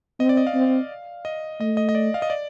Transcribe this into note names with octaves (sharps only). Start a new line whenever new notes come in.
C4 D#5
D5
D#5
F5
C4
D#5
A3 D#5
D#5
D#5
D5
F5
D#5
D5